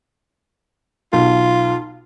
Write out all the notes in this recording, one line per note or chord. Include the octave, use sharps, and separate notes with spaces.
B1 F4